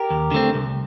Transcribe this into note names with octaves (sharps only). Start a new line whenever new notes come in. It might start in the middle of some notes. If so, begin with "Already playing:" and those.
Already playing: G4 A#4
D#2
D3 A3 C4
C2